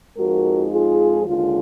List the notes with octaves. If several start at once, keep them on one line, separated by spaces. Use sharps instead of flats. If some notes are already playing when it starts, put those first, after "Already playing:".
F2 F3 G#3 D#4 F#4 A#4
F4 G#4
D#2 D3 G#3 F4